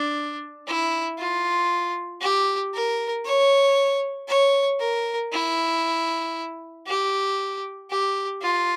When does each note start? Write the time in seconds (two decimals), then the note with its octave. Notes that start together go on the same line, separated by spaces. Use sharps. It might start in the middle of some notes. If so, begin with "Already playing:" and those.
Already playing: D4
0.67 E4
1.18 F4
2.21 G4
2.74 A#4
3.25 C#5
4.28 C#5
4.80 A#4
5.32 E4
6.87 G4
7.90 G4
8.42 F4